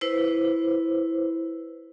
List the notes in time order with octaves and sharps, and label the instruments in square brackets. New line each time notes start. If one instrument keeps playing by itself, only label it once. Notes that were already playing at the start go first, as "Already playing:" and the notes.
[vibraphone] E4 B4 C5